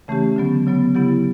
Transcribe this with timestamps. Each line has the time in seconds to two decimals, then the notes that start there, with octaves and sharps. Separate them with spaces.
0.08 C#3 E3 A3 C#4 G4
0.36 D3 F#3 B3
0.67 C#3 F#3 B3
0.95 C#3 F#3 B3 E4 G4